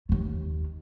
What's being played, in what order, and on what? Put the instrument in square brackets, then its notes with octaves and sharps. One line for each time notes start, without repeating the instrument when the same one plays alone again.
[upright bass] D#2 D#3